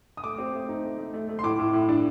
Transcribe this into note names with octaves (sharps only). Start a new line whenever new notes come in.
D#6
A3 D6
C4
A3
D#4
A3
A3
A3
A3
C6
A2 D6
A2
A2
D4